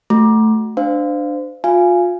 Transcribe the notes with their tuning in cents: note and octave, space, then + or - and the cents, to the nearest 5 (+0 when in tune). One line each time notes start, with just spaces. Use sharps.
A3 +0 F#4 +0
D4 +15 C5 -25 F5 +0
F4 +35 F5 -25 G#5 +0